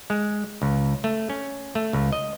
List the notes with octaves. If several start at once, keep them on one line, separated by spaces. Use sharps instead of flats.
G#3
C#2
A3
C#4
A3
C#2
D#5